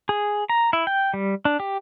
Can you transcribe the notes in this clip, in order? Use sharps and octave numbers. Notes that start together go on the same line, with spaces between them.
G#4
A#5
E4
G5
G3
D4
G4